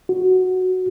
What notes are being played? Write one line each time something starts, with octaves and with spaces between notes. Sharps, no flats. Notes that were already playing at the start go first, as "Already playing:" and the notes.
F#4